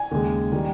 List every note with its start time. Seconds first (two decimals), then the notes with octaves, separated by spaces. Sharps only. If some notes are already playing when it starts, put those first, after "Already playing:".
Already playing: G#5
0.11 D#2 C#3 G#3
0.52 D#3 G3